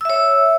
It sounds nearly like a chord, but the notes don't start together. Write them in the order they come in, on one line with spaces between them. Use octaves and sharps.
E6 E5 C#5